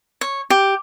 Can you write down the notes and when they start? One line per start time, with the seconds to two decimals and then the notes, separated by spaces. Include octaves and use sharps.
0.21 C#5
0.50 G4